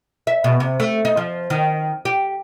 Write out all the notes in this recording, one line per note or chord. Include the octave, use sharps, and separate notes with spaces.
E5
B2
C3
A3
D#4
F3
D#3
G4